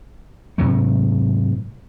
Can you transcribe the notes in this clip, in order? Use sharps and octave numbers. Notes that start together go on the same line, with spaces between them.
G#2 C3 F#3 A3